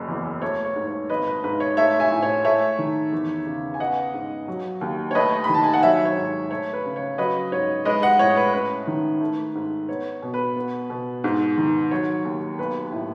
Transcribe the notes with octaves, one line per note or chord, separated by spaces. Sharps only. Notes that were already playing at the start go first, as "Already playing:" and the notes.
Already playing: F#1 F#2
E2
A3 C#5
C#5
G#2
C#5
G#1 B4 D#5
B4
G#2 B4
C#5
A3 C#5 E5
E5 G#5
A2
C#5
A3 C#5 E5
D#3
E2
C#3
G#5
B3 D#5 F#5
G#2
F#3
D#2
C#5
A3 B4 D#5
B5
D#3
A5
G#5
F#5
F#3 C#5 E5
C#5
G#2
A3 C#5
B4
C#3
C#5
F#3 B4 D#5
G#2 C#5
G#3 B4 D#5
D#5 F#5
A2 C#5
B4
C#4 B4
D#3
A3
G#2
B3 C#5
B2
B4
B3
B2
G#2
D#3
F#3 C#5
D#2
B1 B4
A2